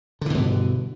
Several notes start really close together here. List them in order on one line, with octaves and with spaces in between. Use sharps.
D3 E3 B2 G2